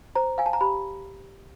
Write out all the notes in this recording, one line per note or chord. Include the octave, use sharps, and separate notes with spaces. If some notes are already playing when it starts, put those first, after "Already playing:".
C5 A#5
F5 G#5
A5
A#5
G4 B5